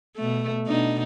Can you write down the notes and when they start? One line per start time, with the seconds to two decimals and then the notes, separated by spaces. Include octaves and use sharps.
0.17 B2 A3
0.67 B2 D4 D#4